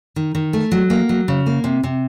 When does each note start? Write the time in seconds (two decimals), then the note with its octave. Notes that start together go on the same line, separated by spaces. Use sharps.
0.16 D#3
0.35 D#3
0.53 A3
0.72 F#3
0.90 A#3
1.09 F#3
1.28 C#3
1.46 A#3
1.64 C3
1.83 C3